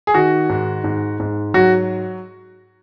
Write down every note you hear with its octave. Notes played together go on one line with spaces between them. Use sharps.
G#4
D#3 F#4
G#2
G#2
G#2
F#3 F#4